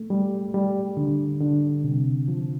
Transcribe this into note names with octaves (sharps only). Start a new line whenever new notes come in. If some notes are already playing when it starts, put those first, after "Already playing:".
Already playing: A3
G3
G3
D3
D3
C3
F3